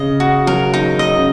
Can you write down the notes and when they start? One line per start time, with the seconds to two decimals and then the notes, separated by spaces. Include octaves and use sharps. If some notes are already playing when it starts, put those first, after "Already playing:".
Already playing: C#3 D#5
0.20 F#4
0.46 F#3 A#4
0.74 D#4
0.99 D#5
1.16 C#3